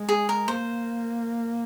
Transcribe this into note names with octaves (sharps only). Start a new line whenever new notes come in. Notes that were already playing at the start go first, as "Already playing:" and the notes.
Already playing: G#3
G#4
A#4
A#3 C5